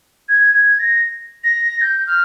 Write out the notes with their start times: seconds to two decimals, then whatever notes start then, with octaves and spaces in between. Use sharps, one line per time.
0.28 G#6
0.54 G#6
0.79 A#6
1.44 A#6
1.81 G6
2.07 F6